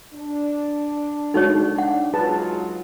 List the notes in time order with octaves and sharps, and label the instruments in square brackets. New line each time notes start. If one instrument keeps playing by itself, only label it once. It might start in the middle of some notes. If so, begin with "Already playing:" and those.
[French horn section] D4
[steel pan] G#3 F#4 A4 [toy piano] D#4 C#5
[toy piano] F#5
[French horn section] F#3 G#3 F4 [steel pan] G#4 B4 A5